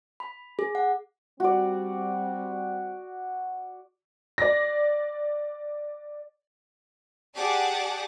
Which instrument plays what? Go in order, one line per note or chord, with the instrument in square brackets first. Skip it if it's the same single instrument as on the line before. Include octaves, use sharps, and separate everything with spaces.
[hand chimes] B5
G#4
F#5
[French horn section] G3 C4 [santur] F#4 D5
[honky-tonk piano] D5 A#6
[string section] G4 G#4 D5 F#5 A5 D6